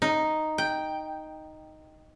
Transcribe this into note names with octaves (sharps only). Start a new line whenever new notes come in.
D#4
G5